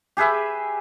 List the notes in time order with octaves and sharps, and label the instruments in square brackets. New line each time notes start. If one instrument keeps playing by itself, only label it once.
[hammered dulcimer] G4 G#4 B4 E5